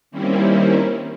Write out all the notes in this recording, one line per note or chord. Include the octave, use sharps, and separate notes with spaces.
D#3 G3 A#3 C4 C#4 E4